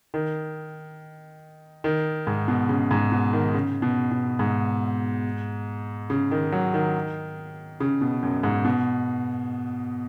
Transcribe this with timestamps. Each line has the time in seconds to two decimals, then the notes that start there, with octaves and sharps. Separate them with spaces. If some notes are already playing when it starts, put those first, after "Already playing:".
0.14 D#3
1.84 D#3
2.27 G#2
2.48 B2
2.69 C#3
2.91 G#2
3.12 B2
3.33 D#3
3.54 C#3
3.82 B2
4.11 B2
4.39 G#2
6.10 C#3
6.31 D#3
6.52 F#3
6.74 D#3
7.80 C#3
8.01 B2
8.22 F#2
8.43 G#2
8.65 B2